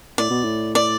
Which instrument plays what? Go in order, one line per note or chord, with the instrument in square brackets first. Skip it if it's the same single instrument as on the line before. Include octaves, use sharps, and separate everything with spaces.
[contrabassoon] A2 [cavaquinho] D5
[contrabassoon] B2
A2
[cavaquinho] D5